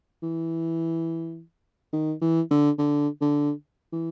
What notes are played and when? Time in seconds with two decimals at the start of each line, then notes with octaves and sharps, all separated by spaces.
0.22 E3
1.93 D#3
2.21 E3
2.51 D3
2.78 D3
3.21 D3
3.92 E3